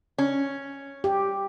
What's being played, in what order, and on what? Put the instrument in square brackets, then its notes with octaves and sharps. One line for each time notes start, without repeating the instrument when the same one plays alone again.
[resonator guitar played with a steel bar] C#4
[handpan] G4